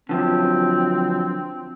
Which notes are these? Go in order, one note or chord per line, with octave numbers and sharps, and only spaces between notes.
D3 F3 F#3 C4